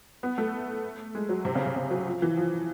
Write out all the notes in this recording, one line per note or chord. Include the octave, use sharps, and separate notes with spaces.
B3
A3
G#3
F#3
C3
C#3
C3
C#3
F#3
F3
E3
F3